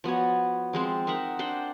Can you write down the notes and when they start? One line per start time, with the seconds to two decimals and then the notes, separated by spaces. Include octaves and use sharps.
0.04 F3 B3 F#4 C#5
0.73 F3 G#3 C4
1.07 D#4 A#4 E5 F#5
1.39 D4 C5 F#5 G5